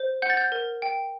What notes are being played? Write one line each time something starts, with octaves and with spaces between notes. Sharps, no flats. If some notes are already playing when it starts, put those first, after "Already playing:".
Already playing: C5
F#5 G6
A6
G6
A#4
G5